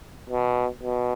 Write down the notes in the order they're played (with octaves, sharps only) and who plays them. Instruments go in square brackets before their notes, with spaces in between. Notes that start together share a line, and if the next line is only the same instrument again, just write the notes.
[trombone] B2
B2